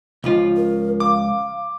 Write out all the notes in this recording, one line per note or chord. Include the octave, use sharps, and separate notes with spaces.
C#2 F3 F4
A#4
F5 D6